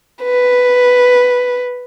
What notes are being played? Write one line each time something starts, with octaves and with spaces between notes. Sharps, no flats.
B4